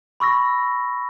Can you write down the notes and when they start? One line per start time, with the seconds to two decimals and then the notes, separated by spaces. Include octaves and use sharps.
0.20 B5 C#6 E6 A#6